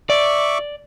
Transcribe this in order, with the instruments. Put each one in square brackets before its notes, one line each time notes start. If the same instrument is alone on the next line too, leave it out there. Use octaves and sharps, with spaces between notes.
[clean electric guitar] D5 [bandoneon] E5 C#6 D6